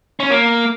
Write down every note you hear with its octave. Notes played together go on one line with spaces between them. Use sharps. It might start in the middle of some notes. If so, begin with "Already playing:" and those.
C#4
A#3